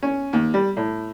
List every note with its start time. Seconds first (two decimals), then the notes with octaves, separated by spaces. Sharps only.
0.02 C#4
0.33 D#2
0.54 G3
0.77 A2